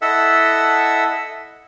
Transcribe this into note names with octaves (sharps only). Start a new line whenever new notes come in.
E4 A4 D#5 E5 F#5 E6